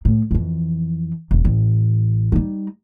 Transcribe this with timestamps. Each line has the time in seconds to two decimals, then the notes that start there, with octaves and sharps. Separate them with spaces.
0.05 A2
0.31 F2 E3
1.31 E1
1.45 A1
2.32 G3 D#4